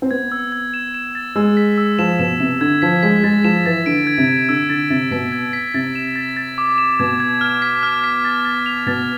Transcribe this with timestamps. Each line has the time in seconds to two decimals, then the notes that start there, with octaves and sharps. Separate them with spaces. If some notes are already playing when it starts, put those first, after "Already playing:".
0.02 C4
0.11 B3 G#6
0.32 E6
0.52 G#6
0.74 E7
0.94 E7
1.15 A6
1.36 G#3 E6
1.57 B6
1.78 E6
1.99 F3 E7
2.19 B2 E7
2.40 C3 E7
2.61 D3 G#6
2.82 F3 B6
3.03 G#3 B6
3.24 G#3 A6
3.44 F3 E7
3.66 E3 A6
3.86 D3 D7
4.07 G#6
4.18 C3
4.28 G#6
4.49 D3 E6
4.70 D3 A6
4.90 C3 A6
5.11 B2 B6
5.32 G#6
5.53 B6
5.74 C3 A6
5.95 E7
6.16 A6
6.37 A6
6.58 D6
6.78 E7
6.99 B2 G#6
7.20 G#6
7.41 F6
7.62 B6
7.83 F6
8.04 B6
8.25 A6
8.45 A6
8.66 F7
8.86 B2 A6